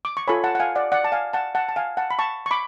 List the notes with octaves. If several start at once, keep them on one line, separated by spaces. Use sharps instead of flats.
D6
C#6
F4 A4 C#5 G#5 B5
F#5 A5
F#5
F5 G#5
D5 F#5
D5 F#5
A5
F5 G#5
F#5 A5
F#5 A5
A5
F5 G#5
F#5 A5
B5
A5 C#6
C#6
B5 D6